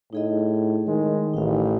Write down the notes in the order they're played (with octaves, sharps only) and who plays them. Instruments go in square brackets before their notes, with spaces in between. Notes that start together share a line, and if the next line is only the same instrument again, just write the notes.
[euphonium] A2 [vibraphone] D#4 G#4 D#5
[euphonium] D#3 [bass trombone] G#3
[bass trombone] A1 [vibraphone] D#4 F5